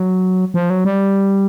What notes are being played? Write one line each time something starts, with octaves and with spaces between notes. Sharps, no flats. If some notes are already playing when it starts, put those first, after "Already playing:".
Already playing: F#3
F3
F#3
G3